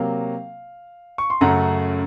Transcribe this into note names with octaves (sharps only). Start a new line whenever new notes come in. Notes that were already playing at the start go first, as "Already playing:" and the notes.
Already playing: C3 F#3 A#3 F5
C#6
C6
F#2 C#3 A3 F#5 A#5